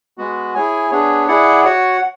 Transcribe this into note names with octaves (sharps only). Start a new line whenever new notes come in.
G#3 B3 F#4
E4 G#4 C#5 G#5
B3 D4 G#4 C#5
E4 G#4 D5 F#5
F#4 C#5 F#5